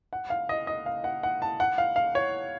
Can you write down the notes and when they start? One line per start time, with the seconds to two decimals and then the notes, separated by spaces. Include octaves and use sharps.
0.13 F#5
0.30 F5
0.49 D#5
0.67 D#5
0.86 F5
1.04 F#5
1.23 F#5
1.42 A5
1.60 F#5
1.78 F5
1.96 F5
2.15 C#5